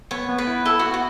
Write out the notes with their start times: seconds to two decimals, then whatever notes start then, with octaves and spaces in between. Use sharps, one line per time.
0.11 B3 C#5
0.29 B3
0.38 B4
0.47 E4
0.66 E4 A4
0.79 F#4
0.84 B3
0.94 F#4